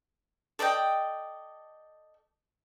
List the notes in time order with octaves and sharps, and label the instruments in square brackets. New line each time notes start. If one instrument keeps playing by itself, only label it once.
[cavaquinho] A4 D5 D#5 G5